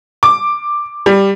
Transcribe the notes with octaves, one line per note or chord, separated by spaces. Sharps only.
D6
G3